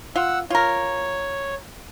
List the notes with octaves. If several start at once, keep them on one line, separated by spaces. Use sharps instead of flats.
F4 F#5 E6
F4 A#4 C#5